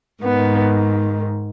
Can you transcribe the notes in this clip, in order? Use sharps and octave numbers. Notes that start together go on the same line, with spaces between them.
G#2 D#3 B3